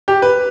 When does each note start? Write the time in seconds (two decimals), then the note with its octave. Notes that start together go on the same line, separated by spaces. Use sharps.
0.08 G4
0.22 B4